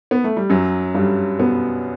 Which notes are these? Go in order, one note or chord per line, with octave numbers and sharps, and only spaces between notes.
B3
A3
G3
F#2 F#3
G2 G3
B2 B3